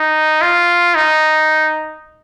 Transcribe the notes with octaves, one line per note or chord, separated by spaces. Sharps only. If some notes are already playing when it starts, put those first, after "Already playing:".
Already playing: D#4
F4
D#4